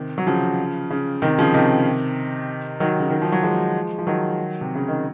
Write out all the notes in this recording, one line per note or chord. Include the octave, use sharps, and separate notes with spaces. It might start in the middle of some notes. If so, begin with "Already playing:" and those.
Already playing: C3 D#3
F#3
C#3 F3
C#3
C3 D#3
C#3 F3
C3 D#3
D#3 F#3
C#3
D#3
F3
F#3
F3 G#3
F3
D#3 F#3
C3
C#3
D#3